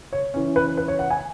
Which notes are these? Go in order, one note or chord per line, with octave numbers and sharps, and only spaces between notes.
C#5
E3 C#4
B4
B4
C#5
F#5
G#5